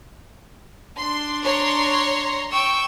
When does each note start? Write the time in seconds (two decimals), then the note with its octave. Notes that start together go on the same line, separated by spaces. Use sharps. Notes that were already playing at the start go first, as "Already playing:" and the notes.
1.00 D4 C6
1.43 C#5 A#5 C6
2.52 G5 C#6 E6